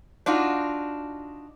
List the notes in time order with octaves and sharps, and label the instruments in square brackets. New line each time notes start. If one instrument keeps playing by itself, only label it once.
[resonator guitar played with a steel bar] D4 D#4 F4 F#4